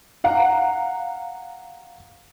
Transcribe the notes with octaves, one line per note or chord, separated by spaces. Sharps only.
F5 F#5 A#5